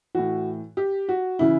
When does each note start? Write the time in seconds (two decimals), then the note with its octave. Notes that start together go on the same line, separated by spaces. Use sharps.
0.15 A2 E3 F#4
0.77 G4
1.09 F#4
1.39 C#3 E3 E4